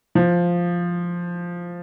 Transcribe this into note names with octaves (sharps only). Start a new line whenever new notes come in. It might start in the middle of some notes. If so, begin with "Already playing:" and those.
F3